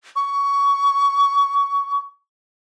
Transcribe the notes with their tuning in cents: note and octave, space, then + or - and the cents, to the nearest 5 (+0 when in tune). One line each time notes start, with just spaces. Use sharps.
C#6 +20